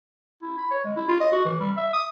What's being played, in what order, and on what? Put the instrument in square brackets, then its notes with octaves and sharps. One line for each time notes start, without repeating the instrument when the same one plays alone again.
[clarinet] E4
B5
C#5
G#3
E4
F4
D#5
F#4
E3
G3
E5
D#6